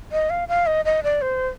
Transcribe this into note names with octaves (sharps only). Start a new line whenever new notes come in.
D#5
F5
F5
D#5
D#5
D5
C5